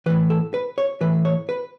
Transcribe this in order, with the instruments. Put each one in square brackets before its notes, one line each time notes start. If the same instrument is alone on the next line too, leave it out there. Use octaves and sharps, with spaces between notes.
[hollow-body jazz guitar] E3 B4
A2
A4
B4
C#5
A2 E3 B4
C#5
B4